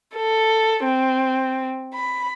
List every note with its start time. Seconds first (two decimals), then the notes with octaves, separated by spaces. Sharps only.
0.15 A4
0.84 C4
1.94 B5